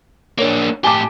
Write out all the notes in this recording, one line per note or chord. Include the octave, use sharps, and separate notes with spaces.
A#3 D4 C#5
A2 G4 G#5 A5 D6